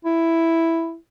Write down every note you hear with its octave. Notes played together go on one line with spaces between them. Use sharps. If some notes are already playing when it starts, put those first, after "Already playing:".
E4